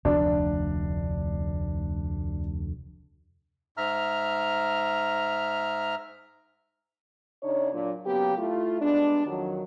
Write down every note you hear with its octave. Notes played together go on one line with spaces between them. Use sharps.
F1 D2 D4
G#2 E5 A#5 F6
C#3 D4 D#4 C#5
A#2 F#3 D4
C#3 F#3 A#3 B3 G4
A3 E4 F4
G3 G#3 B3 D4
F2 D#3 F#3